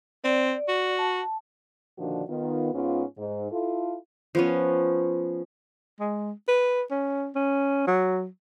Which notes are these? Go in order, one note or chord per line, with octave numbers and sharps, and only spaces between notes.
C4 D5
F#4
A5
A#2 D3 D#3 F3 D4 F#4
D#3 B3 F4
G#2 B3 C#4 F4
G#2
E4 F4 A4
F3 B3 C#4
G#3
B4
C#4
C#4
F#3